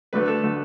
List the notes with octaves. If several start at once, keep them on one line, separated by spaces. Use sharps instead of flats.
D2 D3 A3 B4
A4
D3 A3 A4